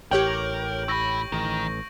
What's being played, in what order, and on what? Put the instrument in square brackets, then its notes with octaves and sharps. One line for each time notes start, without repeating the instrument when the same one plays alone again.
[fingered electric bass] A1 [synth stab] G4 C#5 G5 [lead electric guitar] A#4 [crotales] G6 D7 F#7
[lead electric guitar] E4 B5 [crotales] C#6 A#6
[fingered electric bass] A1 [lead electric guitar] D#3